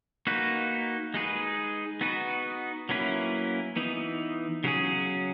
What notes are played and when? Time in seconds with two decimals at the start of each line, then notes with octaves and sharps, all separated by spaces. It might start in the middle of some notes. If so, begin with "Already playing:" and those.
0.27 A#3 D#4 F#4 B4
1.14 G#3 D#4 G#4 B4
2.01 B3 D#4 F#4 B4
2.89 F#3 A#3 C#4 E4 B4
3.76 E3 B3 D#4
4.64 C#3 F#3 C#4 G#4